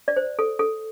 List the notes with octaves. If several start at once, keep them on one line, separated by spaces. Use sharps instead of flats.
D5
C5
A4
A4